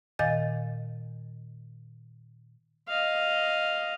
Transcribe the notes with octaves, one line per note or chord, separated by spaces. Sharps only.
A#2 D#3 D#5 F5 G#5 A6
D#5 F5